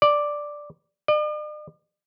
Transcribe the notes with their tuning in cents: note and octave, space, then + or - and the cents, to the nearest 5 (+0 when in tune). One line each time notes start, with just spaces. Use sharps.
D5 +0
D5 +45